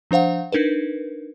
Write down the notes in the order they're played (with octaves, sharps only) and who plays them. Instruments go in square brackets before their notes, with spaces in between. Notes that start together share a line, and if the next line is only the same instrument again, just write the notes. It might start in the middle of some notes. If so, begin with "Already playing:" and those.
[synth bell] F3 D4 C5 F5 F#5
D4 D#4 A#4 B4